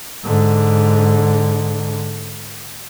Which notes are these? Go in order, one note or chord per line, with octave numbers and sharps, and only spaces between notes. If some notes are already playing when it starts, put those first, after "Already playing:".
G#2 D3